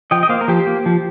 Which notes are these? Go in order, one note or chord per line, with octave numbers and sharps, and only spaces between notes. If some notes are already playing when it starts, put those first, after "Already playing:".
F3 D#5 G5
D#5
A#3 C5 F5
A#4
F3 G4 C5
A#3
F3